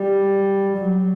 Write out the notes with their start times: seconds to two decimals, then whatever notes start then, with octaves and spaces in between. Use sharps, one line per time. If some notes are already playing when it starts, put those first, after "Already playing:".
Already playing: G3
0.78 F#3